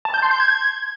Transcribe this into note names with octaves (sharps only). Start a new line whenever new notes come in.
A5
G6
C6
G6
G#6